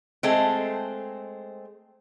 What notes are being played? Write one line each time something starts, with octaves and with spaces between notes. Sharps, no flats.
G#3 A3 C4